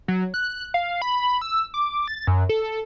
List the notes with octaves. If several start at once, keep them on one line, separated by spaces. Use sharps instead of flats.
F#3
F#6
F5
B5
E6
D6
A6
F#2
A4